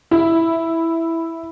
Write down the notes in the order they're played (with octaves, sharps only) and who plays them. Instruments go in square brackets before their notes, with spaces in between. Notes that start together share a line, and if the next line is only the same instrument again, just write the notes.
[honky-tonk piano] E4